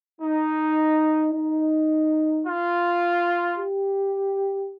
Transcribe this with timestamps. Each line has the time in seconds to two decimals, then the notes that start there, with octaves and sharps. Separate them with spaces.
0.21 D#4
1.33 D#4
2.46 F4
3.58 G4